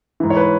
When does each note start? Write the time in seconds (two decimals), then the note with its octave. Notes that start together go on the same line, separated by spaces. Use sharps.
0.20 G#2 E3
0.30 C#5
0.37 B4